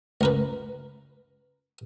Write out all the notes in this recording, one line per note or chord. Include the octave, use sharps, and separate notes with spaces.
C#2 A#4 B4